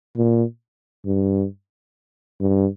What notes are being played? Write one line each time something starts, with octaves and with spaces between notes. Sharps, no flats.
A#2
G2
G2